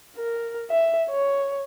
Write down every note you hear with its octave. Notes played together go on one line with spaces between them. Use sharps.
A#4
E5
C#5